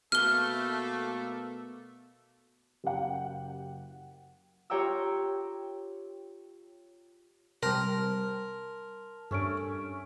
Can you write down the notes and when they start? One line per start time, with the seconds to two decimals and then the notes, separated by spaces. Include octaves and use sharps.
0.12 B2 A3 A#3 A4 F6 G7
2.84 F#1 G4 F#5 G5
4.70 F4 G4 C#5 G5 A#5 E6
7.63 C3 G3 A#4 A5 C6 F6
9.31 G2 A3 C#4 D4 D7